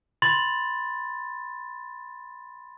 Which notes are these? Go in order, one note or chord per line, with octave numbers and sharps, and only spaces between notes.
B5 C6 A6